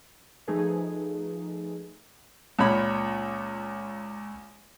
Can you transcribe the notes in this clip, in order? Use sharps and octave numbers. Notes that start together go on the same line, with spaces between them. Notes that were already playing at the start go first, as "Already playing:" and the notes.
F3 A3 D#4 G#4 B4
C#2 A#2 C#5 B5